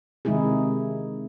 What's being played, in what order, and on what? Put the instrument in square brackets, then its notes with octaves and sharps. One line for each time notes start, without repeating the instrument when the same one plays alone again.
[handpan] C3 D#3 G#3 D#4 E4 G#4